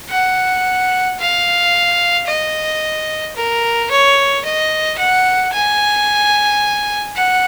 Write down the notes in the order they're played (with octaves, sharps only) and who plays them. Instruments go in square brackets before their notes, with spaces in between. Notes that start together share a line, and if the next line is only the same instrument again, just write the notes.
[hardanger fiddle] F#5
F5
D#5
A#4
C#5
D#5
F#5
G#5
F#5